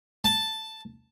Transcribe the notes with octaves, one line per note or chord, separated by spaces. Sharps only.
A5